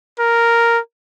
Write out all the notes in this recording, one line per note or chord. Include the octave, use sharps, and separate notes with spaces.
A#4